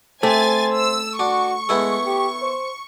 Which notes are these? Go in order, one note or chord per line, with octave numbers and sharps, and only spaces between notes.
C3 A3 C5 G#5 A6
E6
D4 F#4 C#6
G#3 B3 E4 A4
G4
C5